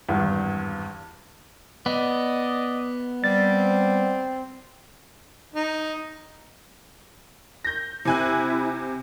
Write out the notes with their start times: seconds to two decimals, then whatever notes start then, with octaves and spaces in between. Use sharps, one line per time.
0.09 G#1 E2 G2
1.86 B3 D5 D#5
3.24 G3 C4 A6
5.54 D#4
7.65 G6 A#6
8.05 C3 E4 G#5 F#6